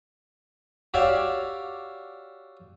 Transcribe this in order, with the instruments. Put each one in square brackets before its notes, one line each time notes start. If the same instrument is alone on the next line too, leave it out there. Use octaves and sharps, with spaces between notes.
[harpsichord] F#4 G4 C#5 D5 E5 F5